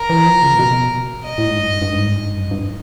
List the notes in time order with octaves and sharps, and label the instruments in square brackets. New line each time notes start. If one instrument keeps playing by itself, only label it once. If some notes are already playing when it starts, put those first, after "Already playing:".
Already playing: [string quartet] A#4
[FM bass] E3
F3
C#3
A#2
B2
[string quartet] D#5
[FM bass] A2
G#2
G2
G2
G#2
G2
F#2
G2